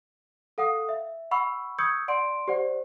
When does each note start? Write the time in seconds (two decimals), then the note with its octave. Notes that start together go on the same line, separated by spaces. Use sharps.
0.58 A4 F5 F#5 D#6
0.89 E5
1.31 F#5 B5 C#6 E6
1.78 C#6 D#6 E6 G6 G#6 C#7
2.08 D5 F#5 C6 D7
2.48 G4 C5 D5 F#5